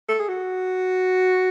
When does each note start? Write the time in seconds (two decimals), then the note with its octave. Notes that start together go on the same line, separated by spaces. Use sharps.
0.08 A4
0.20 G#4
0.28 F#4